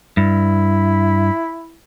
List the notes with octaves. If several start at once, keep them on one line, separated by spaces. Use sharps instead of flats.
G2 E4